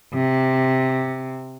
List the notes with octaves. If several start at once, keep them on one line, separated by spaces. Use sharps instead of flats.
C3